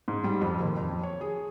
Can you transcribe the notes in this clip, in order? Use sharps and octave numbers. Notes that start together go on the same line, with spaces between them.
G#2
G3
F2
D#2
F2
C#5
G#4